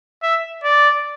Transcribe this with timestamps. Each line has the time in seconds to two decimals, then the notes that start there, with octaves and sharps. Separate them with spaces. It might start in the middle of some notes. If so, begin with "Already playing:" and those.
0.23 E5
0.64 D5